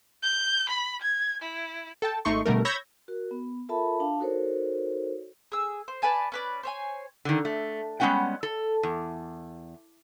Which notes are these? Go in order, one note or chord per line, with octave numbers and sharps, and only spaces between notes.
G6
B5
G#6
E4
A4 G5 A5
G#1 A3 D#4 C6 C#6
B2 D3 G3 A3 A#4
C#5 B5 E6 G6 G#6 A#6
F#4 A#4
B3
F4 A4 A#4 E5 A5 B5
D4 F5 A5
D#4 F#4 A4 A#4 C5 C#5
G#4 E6
C5
B4 D5 G#5 A5
C#4 B4 D5
C5 C#5 G#5
D3 D#3
A3
G3 G#3 B3 C#4 F#5 G5
A4
E2